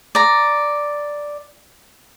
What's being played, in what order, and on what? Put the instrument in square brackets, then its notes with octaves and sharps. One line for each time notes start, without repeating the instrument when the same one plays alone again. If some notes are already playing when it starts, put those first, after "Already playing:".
[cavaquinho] D5 A#5